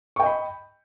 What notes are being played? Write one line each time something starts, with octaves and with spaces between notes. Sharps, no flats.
D#5 G5 B5 C#6